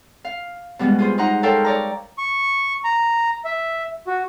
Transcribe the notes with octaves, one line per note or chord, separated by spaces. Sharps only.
F5
B2 G3 G#3 B3
F4 G#4 C5
D#4 C5 F#5 A#5
A4 A#4 C5 C#5 F5 G5
C#5 D5 A#5
C#6
A#5
E5
F#4